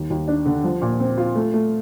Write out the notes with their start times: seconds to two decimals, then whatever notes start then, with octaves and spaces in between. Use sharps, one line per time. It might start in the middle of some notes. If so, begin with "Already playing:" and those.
Already playing: D#2
0.10 D#2
0.28 D4
0.46 D3
0.64 F3
0.82 A#2
1.00 C4
1.18 F4
1.35 A3
1.54 A3